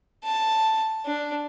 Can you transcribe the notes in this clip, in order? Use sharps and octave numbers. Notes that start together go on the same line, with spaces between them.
A5
D4